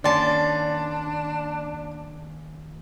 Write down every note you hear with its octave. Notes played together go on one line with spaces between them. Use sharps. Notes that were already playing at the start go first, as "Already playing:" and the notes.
D#3 A#3 C#4 D4 D5 A5 C6